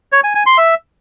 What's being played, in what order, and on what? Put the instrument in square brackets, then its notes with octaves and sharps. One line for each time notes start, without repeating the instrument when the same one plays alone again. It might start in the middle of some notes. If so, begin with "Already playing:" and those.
[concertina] C#5
G#5
G#5
C6
E5